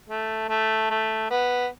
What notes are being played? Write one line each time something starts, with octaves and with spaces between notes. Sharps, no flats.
A3
A3
A3
B3